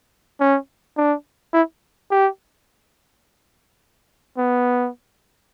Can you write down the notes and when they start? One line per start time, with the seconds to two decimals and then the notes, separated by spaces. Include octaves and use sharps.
0.40 C#4
0.97 D4
1.54 E4
2.11 G4
4.38 B3